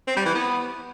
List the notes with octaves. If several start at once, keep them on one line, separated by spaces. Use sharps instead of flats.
C4
G3
E3
B3